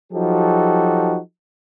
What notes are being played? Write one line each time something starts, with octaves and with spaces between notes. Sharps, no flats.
F3 F#3 D#4 F#4 G4 A4